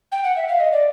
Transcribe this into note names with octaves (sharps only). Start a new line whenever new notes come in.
G5
F#5
E5
F5
D#5
D5